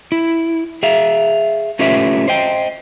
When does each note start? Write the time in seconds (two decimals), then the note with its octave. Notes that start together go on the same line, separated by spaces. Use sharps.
0.12 E4
0.83 G#4 E5 F5
1.79 A3 C#4 F4 G4 B4 E5
2.28 C5 D#5 G5